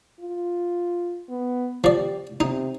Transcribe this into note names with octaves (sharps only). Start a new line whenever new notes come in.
F4
B3
F3 G4 D5
C3 D#4